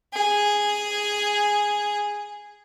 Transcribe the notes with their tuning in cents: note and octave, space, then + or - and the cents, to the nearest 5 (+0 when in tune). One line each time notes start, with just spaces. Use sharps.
G#4 -5